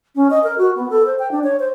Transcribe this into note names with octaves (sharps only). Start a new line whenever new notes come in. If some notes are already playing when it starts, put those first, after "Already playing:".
C#4
D#5
A#4
F#4
B3
A4
C5
G5
D4
C#5
C5